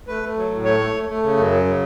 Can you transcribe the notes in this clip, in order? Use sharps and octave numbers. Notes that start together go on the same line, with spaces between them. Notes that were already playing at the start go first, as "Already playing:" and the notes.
A3 B4
A3
F#3
A2
A3 C#5
A3
A3
A3
C#3
F#2
F#3
C#3